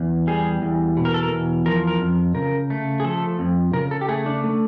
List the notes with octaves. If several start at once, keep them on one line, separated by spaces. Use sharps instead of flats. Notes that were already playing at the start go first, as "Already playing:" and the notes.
Already playing: E2
G3 G#4
E2
B2
A#4
A4
A#4
E2
F3 A#4
A#4
F2
C#3 A#4
A3
G#4
F3 A4
F2
C#3 A#4
A4
G4
A3 G#4
D4
A3